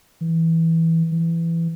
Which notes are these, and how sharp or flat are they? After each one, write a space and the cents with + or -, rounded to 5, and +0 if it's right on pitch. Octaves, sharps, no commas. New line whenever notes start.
E3 -10
E3 +15